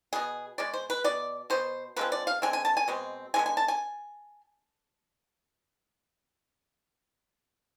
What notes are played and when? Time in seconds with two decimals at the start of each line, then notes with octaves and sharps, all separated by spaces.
0.13 B2 B3 G#4
0.58 B2 G#3 D5
0.74 C5
0.90 B4
1.04 B2 B3 D5
1.50 B2 B3 C5
1.96 D3 F3 G#3 C4 B4
2.12 D5
2.27 F5
2.42 D3 G#3 C4 G#5
2.53 G#5
2.65 A5
2.77 G#5
2.88 B2 G#3 C4
3.34 D3 G#3 B3 G#5
3.46 G#5
3.57 A5
3.68 G#5